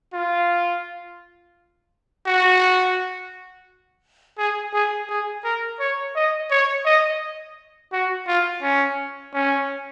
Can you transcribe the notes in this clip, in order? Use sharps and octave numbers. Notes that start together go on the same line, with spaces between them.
F4
F#4
G#4
G#4
G#4
A#4
C#5
D#5
C#5
D#5
F#4
F4
C#4
C#4